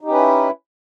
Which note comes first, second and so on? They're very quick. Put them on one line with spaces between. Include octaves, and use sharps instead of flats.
D#4 G4 C#4 B4 E4